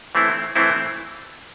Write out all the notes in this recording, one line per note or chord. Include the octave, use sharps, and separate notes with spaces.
E3 A3 C4 E4
E3 A3 C4 E4